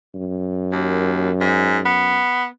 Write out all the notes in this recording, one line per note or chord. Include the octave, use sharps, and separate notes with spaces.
F#2
D#2
G#2
B3